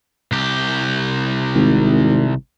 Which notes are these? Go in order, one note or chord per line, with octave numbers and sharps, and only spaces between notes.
C2 G4
G#1